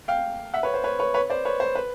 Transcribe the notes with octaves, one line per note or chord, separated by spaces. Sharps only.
F5 G5
E5 F#5
B4 C#5
C5
B4 C#5
B4 C#5
B4 C#5
C5 D5
B4 C#5
C5
B4